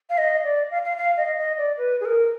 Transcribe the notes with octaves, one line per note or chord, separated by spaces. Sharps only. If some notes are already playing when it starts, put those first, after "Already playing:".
F5
D#5
D5
F5
F5
F5
D#5
D#5
D5
B4
G#4
A#4